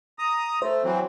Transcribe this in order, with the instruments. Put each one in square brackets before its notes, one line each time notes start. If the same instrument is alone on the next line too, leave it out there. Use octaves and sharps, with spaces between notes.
[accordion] A#5 D#6
[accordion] A3 [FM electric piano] C5
[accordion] E3 F#3 C4